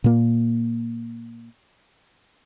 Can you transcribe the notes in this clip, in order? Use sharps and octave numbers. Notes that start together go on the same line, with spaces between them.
A#2 A#3